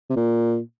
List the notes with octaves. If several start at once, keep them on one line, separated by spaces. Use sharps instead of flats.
C3
A#2